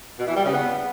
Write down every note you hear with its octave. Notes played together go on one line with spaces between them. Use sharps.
B2
E3
G3
C#3
B3